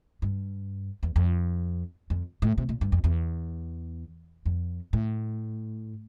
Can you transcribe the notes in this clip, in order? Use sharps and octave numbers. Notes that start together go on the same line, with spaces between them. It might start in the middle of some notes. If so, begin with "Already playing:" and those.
G2
E2
F2
F2
A2
C3
A#2
G2
F2
E2
F2
A2